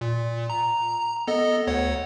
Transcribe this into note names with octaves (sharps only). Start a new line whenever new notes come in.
A#2
A#5
B3 A4 D#5
D2 C#5 F#5